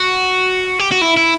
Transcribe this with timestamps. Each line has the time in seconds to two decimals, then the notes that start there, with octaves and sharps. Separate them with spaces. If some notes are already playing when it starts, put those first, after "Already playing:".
Already playing: F#4
0.79 G4
0.92 F#4
1.02 E4
1.17 E4